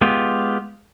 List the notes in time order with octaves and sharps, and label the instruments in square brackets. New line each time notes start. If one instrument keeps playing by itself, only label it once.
[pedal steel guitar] G#3 B3 F4 G4